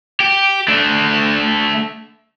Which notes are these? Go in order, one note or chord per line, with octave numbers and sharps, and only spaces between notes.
G4
A3 D4